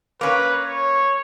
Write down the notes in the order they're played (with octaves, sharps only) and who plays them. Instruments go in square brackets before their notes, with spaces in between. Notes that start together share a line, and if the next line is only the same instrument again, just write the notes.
[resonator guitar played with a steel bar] A#3 C#4 [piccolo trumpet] B4
[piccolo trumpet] C#5